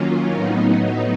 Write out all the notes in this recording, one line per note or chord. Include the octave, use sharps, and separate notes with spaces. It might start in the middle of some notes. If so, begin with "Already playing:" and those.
Already playing: D#3 F#3 A#3 C#4 F4
A2 F#3 B3 D#4